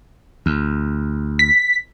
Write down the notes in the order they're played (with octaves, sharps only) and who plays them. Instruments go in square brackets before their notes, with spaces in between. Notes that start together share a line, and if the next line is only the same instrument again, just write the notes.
[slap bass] D2
[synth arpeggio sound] B6